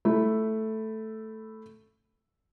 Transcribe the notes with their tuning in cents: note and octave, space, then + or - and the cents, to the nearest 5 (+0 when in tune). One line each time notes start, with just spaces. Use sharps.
A3 +0 E4 +0